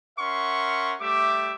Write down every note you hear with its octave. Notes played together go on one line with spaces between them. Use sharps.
C#4 A#4 E5 F#5 C6 C#6
G3 A3 G4 E5 D6